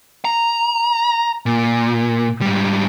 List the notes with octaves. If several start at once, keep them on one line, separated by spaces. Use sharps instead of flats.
A#5
A#2
G#2 G3